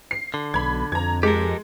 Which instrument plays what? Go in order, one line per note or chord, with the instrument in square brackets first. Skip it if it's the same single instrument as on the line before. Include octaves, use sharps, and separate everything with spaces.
[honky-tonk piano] C7
[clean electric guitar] D3
[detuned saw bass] B1 [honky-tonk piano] B5 G#6
[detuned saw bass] F2 [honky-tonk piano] A#5 G#6
[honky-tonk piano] G#3 [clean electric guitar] G4 A4 A#4